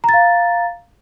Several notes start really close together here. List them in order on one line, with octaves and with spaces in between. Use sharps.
A#5 A6 F5